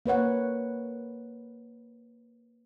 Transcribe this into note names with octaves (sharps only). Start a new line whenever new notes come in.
A#3 B4 C#5 F#5